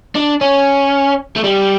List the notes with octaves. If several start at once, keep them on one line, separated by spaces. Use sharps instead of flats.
D4
C#4
A3
G3